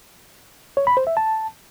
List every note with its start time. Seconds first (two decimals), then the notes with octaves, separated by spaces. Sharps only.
0.77 C#5
0.87 B5
0.97 C5
1.07 E5
1.17 A5